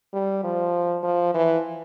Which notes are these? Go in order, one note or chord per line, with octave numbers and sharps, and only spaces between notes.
G3
F3
F3
E3